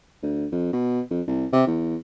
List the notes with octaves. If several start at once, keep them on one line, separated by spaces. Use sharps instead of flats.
D2
F2
B2
F2
C2
C3
E2